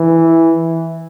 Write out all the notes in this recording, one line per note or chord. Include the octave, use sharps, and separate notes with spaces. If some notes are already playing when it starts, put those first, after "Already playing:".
Already playing: E3